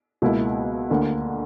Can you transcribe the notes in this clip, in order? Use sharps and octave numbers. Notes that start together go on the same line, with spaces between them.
C#2 B2 A#3 E4
D2 D3 A#3